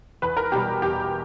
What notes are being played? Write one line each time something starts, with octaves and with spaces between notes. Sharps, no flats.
E2 B4
A#4
B2 G3 G4
E2 G4